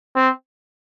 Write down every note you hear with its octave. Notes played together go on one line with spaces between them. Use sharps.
C4